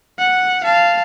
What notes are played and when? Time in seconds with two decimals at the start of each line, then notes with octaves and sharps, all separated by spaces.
0.18 F#5
0.64 F5 A5